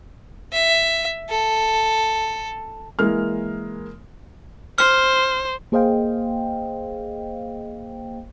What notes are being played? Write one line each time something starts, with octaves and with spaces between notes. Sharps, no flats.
E5
A4
E3 G#3 A#3 F6
C5 F6
A#3 G#4 C5 D#5 F5 G5